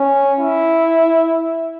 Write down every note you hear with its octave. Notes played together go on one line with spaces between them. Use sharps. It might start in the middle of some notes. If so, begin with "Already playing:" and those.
Already playing: C#4
E4